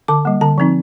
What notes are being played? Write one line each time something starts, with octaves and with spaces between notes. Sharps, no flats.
D3 D6
G3 A#3
D3 A#5
F3 C4 D#4